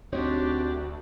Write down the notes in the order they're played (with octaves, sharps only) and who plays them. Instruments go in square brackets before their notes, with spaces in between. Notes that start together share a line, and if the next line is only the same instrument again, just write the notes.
[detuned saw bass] D2 [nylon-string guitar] C4 D#4 C#5 [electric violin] D4 G4 [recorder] F#4